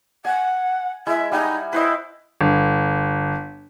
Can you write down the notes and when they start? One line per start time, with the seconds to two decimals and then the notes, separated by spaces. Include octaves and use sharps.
0.25 F#5 G#5
1.07 G#3 E4 E5
1.32 G3 D#4 F#5 G#5
1.73 E4 B4 C5 D#5
2.41 G1